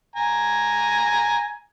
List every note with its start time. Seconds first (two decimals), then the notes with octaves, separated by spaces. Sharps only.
0.16 G#5 A#5